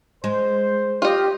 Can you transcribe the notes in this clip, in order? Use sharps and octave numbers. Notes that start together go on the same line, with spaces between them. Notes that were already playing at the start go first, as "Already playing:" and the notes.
G#3 C5
F4 G4 D#5